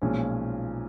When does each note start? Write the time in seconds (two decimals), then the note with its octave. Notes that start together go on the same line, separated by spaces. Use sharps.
0.02 B1 A#2 F3 G#3 C#4